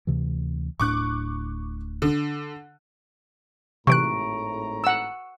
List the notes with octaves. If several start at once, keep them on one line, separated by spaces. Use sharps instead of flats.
D2 C3 E3
D1 A2 D4 C#6 D6 F#6
D3
G#1 A2 C3 E3 A#5 C#6 F#6 D7
F#5 E6